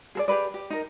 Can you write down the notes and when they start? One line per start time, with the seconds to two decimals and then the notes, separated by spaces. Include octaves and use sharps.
0.15 G#4 A4 D5
0.28 G4 G#4 B4 D5
0.54 G4
0.70 D#4 A#4